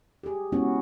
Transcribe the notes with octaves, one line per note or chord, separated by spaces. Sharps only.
G4 G#4
G#3 B3 C#4 E4 F#4